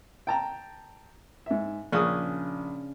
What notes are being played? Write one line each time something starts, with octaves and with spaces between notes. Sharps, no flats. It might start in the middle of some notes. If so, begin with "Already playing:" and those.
G5 A5 A#5
G#2 E5
A#1 C#3 C#4 D4 D#6